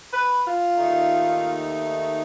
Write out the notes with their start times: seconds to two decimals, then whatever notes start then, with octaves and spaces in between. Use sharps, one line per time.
0.13 B4
0.47 F4
0.75 D#2 A3 D#4